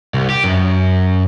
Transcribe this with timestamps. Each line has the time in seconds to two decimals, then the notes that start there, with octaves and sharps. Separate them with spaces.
0.14 C2
0.30 G4
0.44 F#2